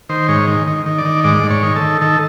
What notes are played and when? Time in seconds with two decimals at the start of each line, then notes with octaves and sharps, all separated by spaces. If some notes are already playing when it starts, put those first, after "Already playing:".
0.09 D#3 C5
0.28 G#2 C#5
0.47 D#3
0.67 D#3
0.86 D#3
0.98 D5
1.05 D#3
1.24 G#2 D5
1.43 G#2
1.50 C#5
1.63 D#3
1.76 A4
1.81 D#3
2.01 D#3 A4